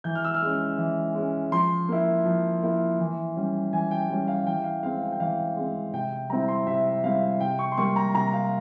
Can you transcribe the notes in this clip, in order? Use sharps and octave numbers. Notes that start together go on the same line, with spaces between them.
E3 G6
F6
E6
F6
G#3 C#4
E3
G#3 C#4
F3 C6
A#3 E4
F3
A#3 E4
E3
G3 C#4
E3 G#5
G5
G3 C#4
F5
E3 G5
F5
G#3 C4 F5
F5
G5
E3 F5
G#3 C4
C3 G5
G3 C4 E4 A#5
C6
C3 E5
G3 C4 E4 F5
C3 G5
C#6
C6
G3 A#3 C#6
A#5
C3 A#5
F5